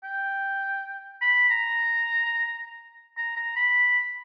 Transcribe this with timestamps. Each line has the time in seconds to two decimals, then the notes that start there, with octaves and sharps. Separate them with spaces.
0.04 G5
1.21 B5
1.50 A#5
3.17 A#5
3.36 A#5
3.56 B5